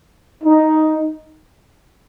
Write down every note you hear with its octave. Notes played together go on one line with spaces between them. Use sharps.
D#4